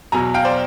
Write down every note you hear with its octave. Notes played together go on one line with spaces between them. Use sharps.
E2 B2 F#3 G#5 A#5
F5 G5
C5 D5